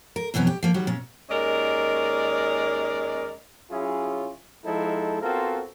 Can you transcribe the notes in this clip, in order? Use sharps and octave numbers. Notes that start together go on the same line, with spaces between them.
A#4
F2 B2 E3 F#3 C#4
G4
F3 A#3
D#3 F#3 G3
A#2 C#4
D#2 G#3 C#4 A#4 D5 D#5
F#3 C#4 E4 F4 G#4
F3 G#3 D#4 E4 A4
B3 C4 F4 F#4 A4 A#4